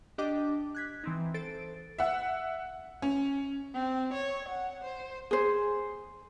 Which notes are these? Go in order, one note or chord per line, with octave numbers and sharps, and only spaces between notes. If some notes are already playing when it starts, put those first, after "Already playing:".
D4 G4 D#5 G5 D6
F#6 G#6 B6
E3 C4 D#4
A4 C5 A6 D7
E5 F#5
C#4
C4
C#5
F#5
C5
G#4 C5